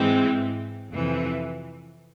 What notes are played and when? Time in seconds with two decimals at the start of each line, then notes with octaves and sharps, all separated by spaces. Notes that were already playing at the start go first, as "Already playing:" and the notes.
Already playing: G#2 E3 G#3 C4
0.92 F2 C3 E3